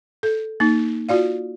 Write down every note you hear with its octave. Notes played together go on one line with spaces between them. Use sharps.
A4
A#3 D#4
F4 F#4 D5 F5